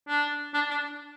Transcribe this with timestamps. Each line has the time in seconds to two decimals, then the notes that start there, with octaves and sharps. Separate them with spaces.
0.08 D4
0.54 D4
0.70 D4